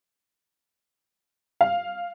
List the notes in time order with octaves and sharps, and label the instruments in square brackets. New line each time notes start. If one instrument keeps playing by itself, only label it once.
[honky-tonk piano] F5